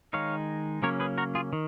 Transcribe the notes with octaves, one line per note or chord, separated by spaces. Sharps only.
D#3 G#3 D#4 C#5 F5
C#3 F#3 A#3 C#4 A#4 C#5
G#4 B4
F#4 A#4
F4 G#4
D#3